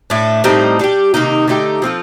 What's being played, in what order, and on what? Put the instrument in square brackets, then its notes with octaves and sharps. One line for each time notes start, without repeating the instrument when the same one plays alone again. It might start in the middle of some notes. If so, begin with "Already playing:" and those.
[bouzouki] A2 A3 D4
A2 G3 C4 D#4
G3 D4 G4
C3 D#3 A#3 D#4
D3 A3 D#4 G4
F3 C4 F4 A4